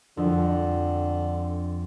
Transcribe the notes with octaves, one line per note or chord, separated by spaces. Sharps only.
F2 D3